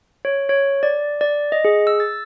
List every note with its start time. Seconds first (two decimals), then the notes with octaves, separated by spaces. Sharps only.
0.25 C#5
0.49 C#5
0.83 D5
1.21 D5
1.52 D#5
1.65 G#4
1.87 E6
2.00 A6